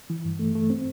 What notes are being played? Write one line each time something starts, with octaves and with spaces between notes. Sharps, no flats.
E3
G2
A3
A3
C4